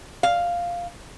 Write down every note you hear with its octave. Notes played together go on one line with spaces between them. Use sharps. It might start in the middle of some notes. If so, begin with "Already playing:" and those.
F5